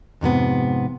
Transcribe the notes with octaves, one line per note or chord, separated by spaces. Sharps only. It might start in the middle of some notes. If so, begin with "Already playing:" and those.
F2 G#2 C3 B3